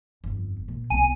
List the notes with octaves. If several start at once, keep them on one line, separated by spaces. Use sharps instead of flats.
G1 F2
A#2
C2 B3 G#5